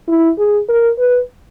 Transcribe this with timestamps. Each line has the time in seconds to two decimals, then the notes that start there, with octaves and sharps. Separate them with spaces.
0.08 E4
0.38 G#4
0.69 A#4
0.99 B4